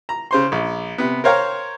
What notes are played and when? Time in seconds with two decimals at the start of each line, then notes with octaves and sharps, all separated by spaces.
0.09 A#5
0.31 C#3 C5 C6
0.52 A#1
0.98 C3 B3
1.24 A#4 C5 C#5 F5 G5 A#5